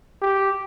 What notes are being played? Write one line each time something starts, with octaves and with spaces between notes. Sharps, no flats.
G4